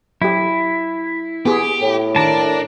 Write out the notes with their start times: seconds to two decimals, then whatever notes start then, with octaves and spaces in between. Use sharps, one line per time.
0.22 F#3 E4 G4
1.46 B3 G4 G#4
1.81 A2
2.16 D#3 D4 A#4 A5